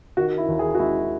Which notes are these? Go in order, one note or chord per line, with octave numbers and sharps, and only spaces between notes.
D#3 F#4
E4
D#2
G#4
F#4
G#3 E4